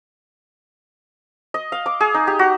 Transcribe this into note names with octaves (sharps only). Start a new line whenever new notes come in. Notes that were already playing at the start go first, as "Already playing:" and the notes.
D#5
F5
D6
G#4
D#4
G4
F#4